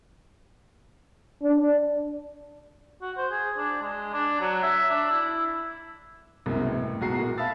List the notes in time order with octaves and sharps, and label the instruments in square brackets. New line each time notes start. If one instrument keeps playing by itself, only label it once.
[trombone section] D4
[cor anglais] F#4
C5
G#4
D4
G#3
D4
F#3
E5
D4
E4
[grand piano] C2 F#2 B2 G#3 A#3
A1
B1 A2 G#3 F#4 A#5 C7
A#2 A#3
E5 F5 A5 B5 E6 A6